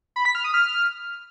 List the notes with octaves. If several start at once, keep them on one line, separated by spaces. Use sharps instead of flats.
B5
B6
F6
D#6
F6